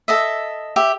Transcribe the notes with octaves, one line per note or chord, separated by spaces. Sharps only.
A4 D#5 E5
G4 E5